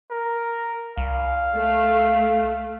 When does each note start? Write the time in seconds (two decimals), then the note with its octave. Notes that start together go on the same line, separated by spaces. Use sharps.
0.10 A#4
0.97 C2 F5
1.55 A3